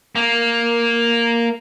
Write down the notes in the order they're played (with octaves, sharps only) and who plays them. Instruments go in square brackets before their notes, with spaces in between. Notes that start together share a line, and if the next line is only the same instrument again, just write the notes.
[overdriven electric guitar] A#3